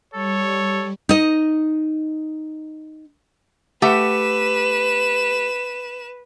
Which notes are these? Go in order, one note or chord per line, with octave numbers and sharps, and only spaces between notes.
G3 A4 C#5
D#4 D#5
A3 G4 B4 F#5 E7